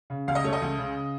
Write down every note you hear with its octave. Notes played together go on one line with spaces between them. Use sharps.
C#3
C#2 F5
D#5
A3 C#5
D#5
C#2
C#3